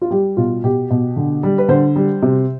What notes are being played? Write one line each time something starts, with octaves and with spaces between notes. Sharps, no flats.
F4
G3 G4
B2 F4
B2 G4
B2
D3
G3
B4
D3 C5
G3
C3